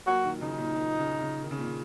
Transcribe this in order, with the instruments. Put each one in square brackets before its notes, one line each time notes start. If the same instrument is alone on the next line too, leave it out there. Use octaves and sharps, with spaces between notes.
[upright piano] F#3 A#3 [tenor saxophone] F#4
[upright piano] A#2 D#3
[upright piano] C#3 [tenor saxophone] D#4
[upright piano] A#2
A#2
C#3
C#3
D#3
C#3
A#2
C#3